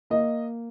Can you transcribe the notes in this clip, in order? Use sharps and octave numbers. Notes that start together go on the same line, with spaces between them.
A#3 D#5